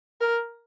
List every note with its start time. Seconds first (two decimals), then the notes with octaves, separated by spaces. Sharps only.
0.21 A#4